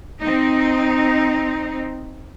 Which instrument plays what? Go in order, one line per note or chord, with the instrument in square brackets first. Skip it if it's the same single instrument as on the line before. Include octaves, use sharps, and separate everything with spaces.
[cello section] C4 D#4